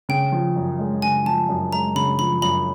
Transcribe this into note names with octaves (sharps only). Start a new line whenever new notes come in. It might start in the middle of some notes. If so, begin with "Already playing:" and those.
C#3 G5
F3
F#2
G#3
C#3 G#5
F3 A5
F#2
G#3 A#5
C#3 B5
F3 B5
F#2 B5